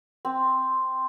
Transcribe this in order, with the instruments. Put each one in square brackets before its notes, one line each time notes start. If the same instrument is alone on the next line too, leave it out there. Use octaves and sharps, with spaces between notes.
[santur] C4